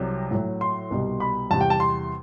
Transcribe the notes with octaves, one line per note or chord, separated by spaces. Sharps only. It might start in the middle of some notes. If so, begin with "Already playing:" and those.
Already playing: C2 C3 F#3
A2 F#3
C6
C2 B2 G3
B5
E2 C3 G3 A5
G5
A5
C6